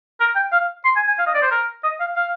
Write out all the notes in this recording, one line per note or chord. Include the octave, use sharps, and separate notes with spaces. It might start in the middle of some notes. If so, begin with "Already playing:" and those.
A#4
G5
F5
C6
G#5
G#5
F5
D#5
D5
C5
A#4
D#5
F5
F5